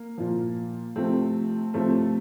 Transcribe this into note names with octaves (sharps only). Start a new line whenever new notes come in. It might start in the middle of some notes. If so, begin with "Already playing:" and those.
Already playing: A#3
A#2 F3
C3 F3 A3 C4
C3 F3 A3 C4